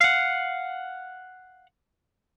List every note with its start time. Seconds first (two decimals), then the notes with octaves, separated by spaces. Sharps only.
0.01 F5 F#5